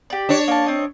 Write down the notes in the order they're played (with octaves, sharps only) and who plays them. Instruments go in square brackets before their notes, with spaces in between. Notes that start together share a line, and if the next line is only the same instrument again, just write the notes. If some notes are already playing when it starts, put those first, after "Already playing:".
[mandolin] G4 D5
[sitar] D4 C#5
[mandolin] A#3 A5
C4 D#5